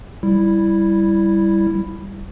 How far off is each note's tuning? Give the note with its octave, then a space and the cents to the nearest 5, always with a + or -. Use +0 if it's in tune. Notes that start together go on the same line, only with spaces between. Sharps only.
G3 +0 E4 +0